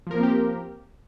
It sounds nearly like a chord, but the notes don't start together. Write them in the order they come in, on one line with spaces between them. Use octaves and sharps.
F3 A#4 A#3 C4 G4